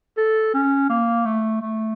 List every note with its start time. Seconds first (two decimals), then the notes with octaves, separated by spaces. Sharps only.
0.17 A4
0.54 C#4
0.90 A#3
1.25 A3
1.61 A3